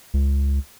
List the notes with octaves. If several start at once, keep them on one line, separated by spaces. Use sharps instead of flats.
C#2